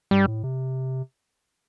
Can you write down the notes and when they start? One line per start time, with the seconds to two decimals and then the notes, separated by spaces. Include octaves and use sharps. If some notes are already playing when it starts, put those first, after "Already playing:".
0.11 G2 G3
0.28 A2
0.43 C3